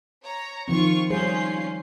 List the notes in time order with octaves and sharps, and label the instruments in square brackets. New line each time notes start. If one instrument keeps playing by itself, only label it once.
[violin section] C#5 A#5
[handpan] D#3 F3 C4 [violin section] F4 C#6
[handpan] G3 G#4 C5 [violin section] C#4 F4 C7